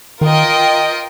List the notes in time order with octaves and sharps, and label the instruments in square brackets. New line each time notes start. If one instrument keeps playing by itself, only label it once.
[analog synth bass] D#3 [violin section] F4 A#4 D#5 G5